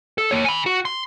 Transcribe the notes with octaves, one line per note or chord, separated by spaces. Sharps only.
A4
A#3 C#5
G#5 B5
F#4
C6